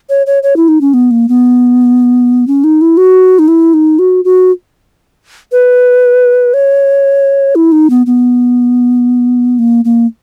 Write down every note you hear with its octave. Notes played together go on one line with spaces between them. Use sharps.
C#5
C#5
C#5
E4
D#4
C#4
B3
A#3
B3
C#4
D#4
E4
F#4
D#4
E4
D#4
F#4
F#4
B4
C#5
E4
D#4
B3
B3
A#3
A#3